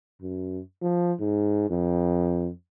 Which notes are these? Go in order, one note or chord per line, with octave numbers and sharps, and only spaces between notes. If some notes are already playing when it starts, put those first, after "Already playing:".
F#2
F3
G#2
F2